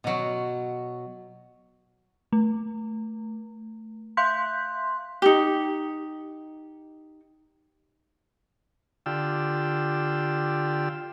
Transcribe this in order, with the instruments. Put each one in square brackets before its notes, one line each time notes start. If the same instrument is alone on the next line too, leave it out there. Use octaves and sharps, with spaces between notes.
[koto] B2 F#3
[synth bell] A3
E5 F5 C6 F#6 G6 B6
[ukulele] D#4 G4
[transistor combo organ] D3 F4 G4 E6